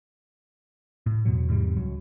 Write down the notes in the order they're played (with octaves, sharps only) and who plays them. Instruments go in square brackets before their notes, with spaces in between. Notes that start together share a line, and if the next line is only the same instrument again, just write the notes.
[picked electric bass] A2
E2 B2 F#3
E2 G#2 C3 G3
C#2 F#3